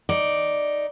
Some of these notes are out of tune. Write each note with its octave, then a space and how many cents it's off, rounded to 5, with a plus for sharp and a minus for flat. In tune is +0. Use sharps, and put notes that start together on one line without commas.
D#4 +0 D5 +0